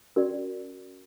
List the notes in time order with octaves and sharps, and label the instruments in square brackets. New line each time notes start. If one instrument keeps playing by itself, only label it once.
[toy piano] C#4 F#4 A#4 D5